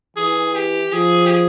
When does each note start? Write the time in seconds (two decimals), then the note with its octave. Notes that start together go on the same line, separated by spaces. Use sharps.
0.17 E3 G#4
0.55 G4
0.92 F3 G#4
1.26 G4
1.30 G#4